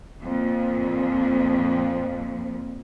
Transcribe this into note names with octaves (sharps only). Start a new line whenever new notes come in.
F2 A#2 F3